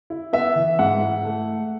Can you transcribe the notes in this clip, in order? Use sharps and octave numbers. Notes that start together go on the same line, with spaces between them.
E4
B3 E5
E3
G#2 F#5
E4
A3